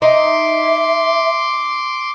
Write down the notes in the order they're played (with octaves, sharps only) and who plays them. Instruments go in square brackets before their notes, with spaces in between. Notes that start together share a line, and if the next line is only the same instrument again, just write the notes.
[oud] D#4 [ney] E5 [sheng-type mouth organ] C6 D6